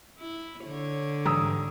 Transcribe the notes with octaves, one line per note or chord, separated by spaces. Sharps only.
E4
D3 C#5
G#2 E3 G3 A#5 D#6 E6